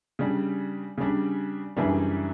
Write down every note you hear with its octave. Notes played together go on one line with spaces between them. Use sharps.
C#3 G3 D4
C#3 G3 D4
F#2 C#3 E3 G3 D4